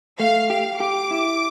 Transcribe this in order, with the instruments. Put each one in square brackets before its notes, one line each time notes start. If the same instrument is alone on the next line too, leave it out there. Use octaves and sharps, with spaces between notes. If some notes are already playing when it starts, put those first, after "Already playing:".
[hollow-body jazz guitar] A3 [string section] F5
[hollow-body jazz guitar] G4 [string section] F5
[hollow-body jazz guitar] G4 [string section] D6
[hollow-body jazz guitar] E4